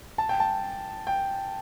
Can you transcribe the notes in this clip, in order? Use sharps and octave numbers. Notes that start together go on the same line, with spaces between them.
A5
G5
A5
G5